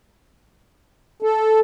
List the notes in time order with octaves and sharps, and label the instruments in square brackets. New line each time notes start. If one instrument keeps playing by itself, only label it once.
[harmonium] A4